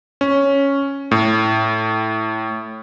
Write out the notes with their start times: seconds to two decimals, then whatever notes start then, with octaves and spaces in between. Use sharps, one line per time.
0.21 C#4
1.11 A2